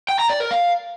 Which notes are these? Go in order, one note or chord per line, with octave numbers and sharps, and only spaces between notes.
G5
A#5
D5
A#4
F5